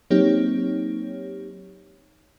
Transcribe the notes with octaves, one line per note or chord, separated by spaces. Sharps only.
F#3 A#3 C4 D#4 G4 C#5